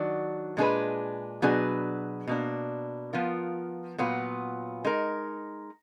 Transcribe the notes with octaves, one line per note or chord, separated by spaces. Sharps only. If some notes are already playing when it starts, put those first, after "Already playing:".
Already playing: D#3 F#3 D4 F#4
A#2 G#3 D4 G#4 B4
B2 F#3 D4 G#4 B4
B2 A#3 D4
F3 B3 F4 A#4
A#2 F#3 B3 F4
G#3 D#4 A#4